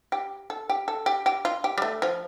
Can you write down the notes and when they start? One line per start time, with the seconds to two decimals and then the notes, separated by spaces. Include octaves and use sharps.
0.12 G4
0.50 A4
0.69 G4
0.88 A4
1.06 G4
1.26 G4
1.45 F4
1.64 G4
1.78 G3
1.82 A3
2.02 F3